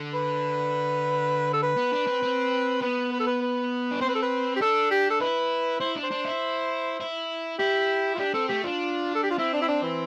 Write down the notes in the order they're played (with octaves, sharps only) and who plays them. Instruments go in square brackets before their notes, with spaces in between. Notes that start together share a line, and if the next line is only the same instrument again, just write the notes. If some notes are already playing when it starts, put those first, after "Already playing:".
Already playing: [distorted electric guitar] D3
[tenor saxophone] B4
A4
B4
[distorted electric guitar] B3
D4
C4
C4
[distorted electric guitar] B3 [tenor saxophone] B4
[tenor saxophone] B4
A4
B4
B4
[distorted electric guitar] D4
[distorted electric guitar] C4 [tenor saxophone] C5
[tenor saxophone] B4
A4
B4
G4
[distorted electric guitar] D4 [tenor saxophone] A4
[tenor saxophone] G4
A4
[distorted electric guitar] E4 [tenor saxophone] B4
[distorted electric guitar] E4 [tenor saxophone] C5
[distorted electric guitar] D4
[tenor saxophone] C5
[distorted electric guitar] D4
E4
E4
[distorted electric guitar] E4 [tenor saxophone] G4
[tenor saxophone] F4
[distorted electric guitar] D4 [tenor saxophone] G4
[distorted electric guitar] C4 [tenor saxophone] A4
[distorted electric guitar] A3 [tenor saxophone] G4
[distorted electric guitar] D4 [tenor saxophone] F4
[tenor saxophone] A4
G4
F4
[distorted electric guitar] C4 [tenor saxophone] E4
[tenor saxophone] D4
E4
D4
E3